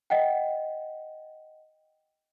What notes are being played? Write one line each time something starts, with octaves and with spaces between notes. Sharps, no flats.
D#5 F#5 G5